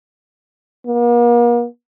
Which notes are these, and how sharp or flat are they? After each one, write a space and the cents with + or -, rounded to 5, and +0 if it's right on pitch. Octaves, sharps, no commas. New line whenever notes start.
A#3 +40